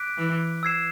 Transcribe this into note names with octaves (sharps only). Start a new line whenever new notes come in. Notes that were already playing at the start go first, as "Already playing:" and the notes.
Already playing: D6 F#6 B6 D7
E3
E6 G#6 C7 E7